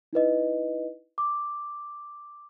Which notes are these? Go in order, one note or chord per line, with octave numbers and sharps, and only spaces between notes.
D#4 E4 B4 D#5
D6